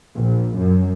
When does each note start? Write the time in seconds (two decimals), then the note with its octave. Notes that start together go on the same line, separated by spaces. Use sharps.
0.15 A#1
0.56 F#2